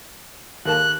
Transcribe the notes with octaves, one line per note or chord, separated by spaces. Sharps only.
D#2 A#3 A5 F#6